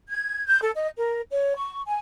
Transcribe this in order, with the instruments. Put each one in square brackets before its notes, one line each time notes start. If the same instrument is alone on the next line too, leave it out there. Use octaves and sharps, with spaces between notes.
[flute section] G#6
G6
A4
D#5
A#4
C#5
C#6
G#5